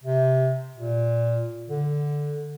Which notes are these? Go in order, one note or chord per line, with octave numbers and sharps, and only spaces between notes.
C3
A#2
D3